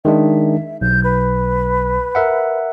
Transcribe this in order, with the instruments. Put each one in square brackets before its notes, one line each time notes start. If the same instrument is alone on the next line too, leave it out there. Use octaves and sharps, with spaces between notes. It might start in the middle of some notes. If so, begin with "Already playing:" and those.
[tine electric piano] D#3 G#3 D4 [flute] E5
[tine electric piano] B1 [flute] G6
[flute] B4
[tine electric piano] A#4 E5 F#5